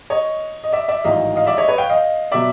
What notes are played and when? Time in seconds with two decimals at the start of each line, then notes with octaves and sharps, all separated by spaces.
0.10 C#5 D#5
0.64 D#5
0.72 D5 E5
0.88 D5 E5
1.04 A1 G#2 D#3 F#3 D#5 F5
1.36 D#5 F5
1.47 D5 E5
1.57 C#5 D#5
1.68 B4 C#5
1.78 F5 G5
1.90 D#5 F5
2.32 B2 F#3 D5 E5